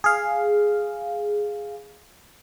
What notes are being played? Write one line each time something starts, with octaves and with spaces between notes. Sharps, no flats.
G#4 F5